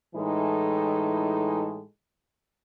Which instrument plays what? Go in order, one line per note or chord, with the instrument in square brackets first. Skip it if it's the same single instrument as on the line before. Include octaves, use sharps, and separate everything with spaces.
[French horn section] A2 E3 G#3 D#4 A4